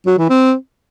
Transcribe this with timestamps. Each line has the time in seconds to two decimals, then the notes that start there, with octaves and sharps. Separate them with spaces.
0.07 F#3
0.18 E3
0.30 C4